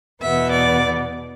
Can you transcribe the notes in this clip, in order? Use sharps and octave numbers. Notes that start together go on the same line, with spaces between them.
E2 B2 B3 E5
D5